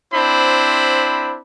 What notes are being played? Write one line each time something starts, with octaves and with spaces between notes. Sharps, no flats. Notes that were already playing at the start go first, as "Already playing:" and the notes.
C4 D4 E4 C5 B5